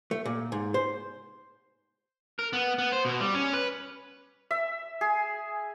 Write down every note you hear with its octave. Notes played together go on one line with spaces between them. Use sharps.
A3
A#2
G#2
C5
A#4
B3
B3
C5
B2
G3
C#4
B4
E5
G#4